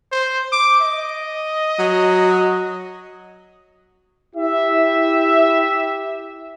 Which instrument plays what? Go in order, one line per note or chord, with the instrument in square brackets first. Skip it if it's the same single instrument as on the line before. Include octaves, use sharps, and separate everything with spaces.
[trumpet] C5
D6
D#5
[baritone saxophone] F#3
[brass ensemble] E4 G4 E5